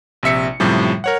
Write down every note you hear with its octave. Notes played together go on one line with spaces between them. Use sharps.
A#1 C3 E5 C#7
F#2 A2 C3 F3 G3
A#4 C#5 F#5